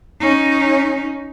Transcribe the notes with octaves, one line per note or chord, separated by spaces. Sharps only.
C#4 D#4